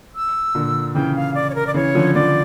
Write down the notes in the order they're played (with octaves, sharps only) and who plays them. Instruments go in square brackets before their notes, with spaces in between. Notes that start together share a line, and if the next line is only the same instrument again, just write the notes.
[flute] E6
[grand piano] A#2 D3
[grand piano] C#3 E3 [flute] G5
[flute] F5
D5
C#5
A#4
D5
[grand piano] C#3 E3 [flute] C#5
[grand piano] D3 F3
[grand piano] D3 F3 [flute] D5